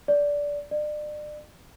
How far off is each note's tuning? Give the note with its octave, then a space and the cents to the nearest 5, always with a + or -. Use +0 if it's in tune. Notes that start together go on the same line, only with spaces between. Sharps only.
D5 -15
D5 +35